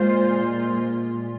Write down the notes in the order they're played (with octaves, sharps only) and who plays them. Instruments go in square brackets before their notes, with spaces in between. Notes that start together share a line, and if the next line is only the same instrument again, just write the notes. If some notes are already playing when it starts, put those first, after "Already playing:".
Already playing: [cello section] A#2 G#3 F4 C5